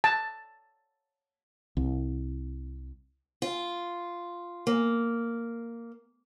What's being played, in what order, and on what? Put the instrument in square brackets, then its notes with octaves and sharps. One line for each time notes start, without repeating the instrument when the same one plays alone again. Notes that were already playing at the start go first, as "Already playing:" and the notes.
[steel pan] A5
[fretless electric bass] C2
[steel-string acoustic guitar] F4
A#3